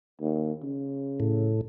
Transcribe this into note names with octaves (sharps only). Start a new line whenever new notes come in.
D#2
C#3
A2